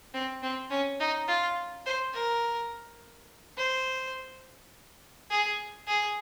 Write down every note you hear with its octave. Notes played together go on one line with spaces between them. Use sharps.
C4
C4
C#4
D#4
F4
C5
A#4
C5
G#4
G#4